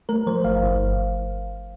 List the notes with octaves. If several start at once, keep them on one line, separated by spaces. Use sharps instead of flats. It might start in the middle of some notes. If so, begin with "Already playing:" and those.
A3 A#4
F3 C5
G1 F5
G1